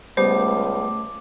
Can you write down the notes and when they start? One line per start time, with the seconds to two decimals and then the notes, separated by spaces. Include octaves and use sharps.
0.17 C#2 G3 A3 B3 C5 D6